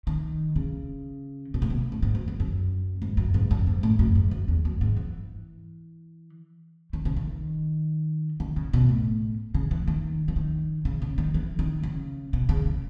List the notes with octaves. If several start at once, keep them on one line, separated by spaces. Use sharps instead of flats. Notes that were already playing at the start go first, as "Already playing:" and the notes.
D#3
C#3
B2
A2
B2
A2
G#2
F#2
E2
F#2
G#2
F#2
G#2
F#2
G#2
A2
F#2
G#2
F#2
E2
F#2
G#2
E3
D#3
C#3
D#3
D#3
C#3
B2
A2
C#3
E3
D#3
E3
D#3
C#3
C#3
D#3
E3
D#3
C#3
B2
C#3
C#3